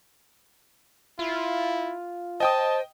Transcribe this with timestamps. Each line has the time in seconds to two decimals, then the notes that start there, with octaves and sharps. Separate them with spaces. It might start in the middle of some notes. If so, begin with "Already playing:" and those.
1.19 E4 F4
2.40 C5 D#5 G5 A5 D#6